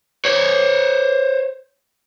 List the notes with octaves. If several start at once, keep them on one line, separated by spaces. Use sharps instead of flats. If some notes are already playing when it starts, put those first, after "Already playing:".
C5 C#5